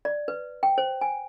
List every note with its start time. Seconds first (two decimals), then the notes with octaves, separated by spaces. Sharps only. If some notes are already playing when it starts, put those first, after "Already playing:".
0.05 D5
0.28 B4
0.63 G5
0.78 C5
1.01 G#5